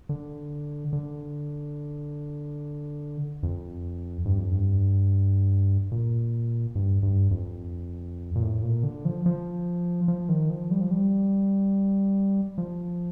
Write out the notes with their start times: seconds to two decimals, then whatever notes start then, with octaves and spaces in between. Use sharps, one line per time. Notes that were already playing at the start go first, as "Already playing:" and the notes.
0.09 D3
0.93 D3
3.43 F2
4.25 G2
4.38 F2
4.51 G2
5.92 A#2
6.75 G2
7.03 G2
7.31 F2
8.36 A#2
8.42 A2
8.63 A#2
8.83 D3
9.05 F3
9.26 F3
10.08 F3
10.29 D#3
10.50 F3
10.71 G3
10.81 F3
10.91 G3
12.58 F3